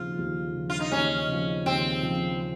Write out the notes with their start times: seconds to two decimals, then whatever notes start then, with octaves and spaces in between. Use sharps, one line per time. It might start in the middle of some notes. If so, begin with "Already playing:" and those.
Already playing: D#2 C#3 F3 F4
0.18 D#2
0.56 C#3 F3
0.70 F4
0.80 D#4
0.92 D#2 C#4
1.29 C#3 F3
1.65 D#2 C4
2.02 C#3 F3